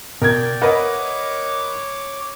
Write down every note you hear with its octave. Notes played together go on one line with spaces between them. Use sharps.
B2 A#4 D5 G5 G#6
A#4 B4 C#5 D#5 E5 F#5 D6